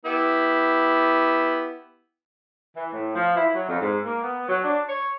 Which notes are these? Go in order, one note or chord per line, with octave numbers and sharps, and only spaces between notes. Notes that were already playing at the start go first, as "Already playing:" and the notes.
B3 E4 G4
E3
A2
F3
E4
F#3
F2
G#2
A#3
B3
F#3
D4
C#5